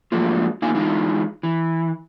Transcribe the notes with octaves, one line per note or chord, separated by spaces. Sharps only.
G#2 F3 F#3 A3 A#3 F4
A#3 D#4 F4 F5 G#5
E3 G#3 D#4 F4
E3